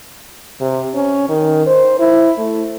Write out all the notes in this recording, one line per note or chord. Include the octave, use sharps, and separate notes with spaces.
C3
C#4
D#3
C5
E4
A3